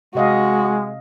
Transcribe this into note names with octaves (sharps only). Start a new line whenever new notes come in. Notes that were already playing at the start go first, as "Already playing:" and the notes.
C3 G#3 F#4 D#5 F5